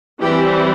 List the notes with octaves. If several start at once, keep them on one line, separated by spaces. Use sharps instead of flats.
E3 G3 C4 G4